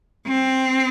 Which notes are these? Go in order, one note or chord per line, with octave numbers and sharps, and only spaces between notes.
C4